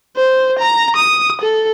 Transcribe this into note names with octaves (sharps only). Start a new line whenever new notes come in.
C5
A#5
D#6
A4